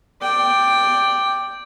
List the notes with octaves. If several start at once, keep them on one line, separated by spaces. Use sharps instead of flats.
D5 G5